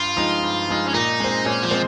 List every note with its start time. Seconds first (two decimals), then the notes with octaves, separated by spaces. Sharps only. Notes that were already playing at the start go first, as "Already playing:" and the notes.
Already playing: G2 F4
0.17 F3 G#3 D#4
0.43 G2
0.69 F3 G#3 D#4
0.87 C#4
0.94 A#2 D#4
1.20 G#3 C4
1.46 A#2 C#4
1.63 F3
1.71 G#3 C4